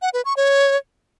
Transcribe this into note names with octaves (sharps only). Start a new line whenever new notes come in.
F#5
B4
C#6
C#5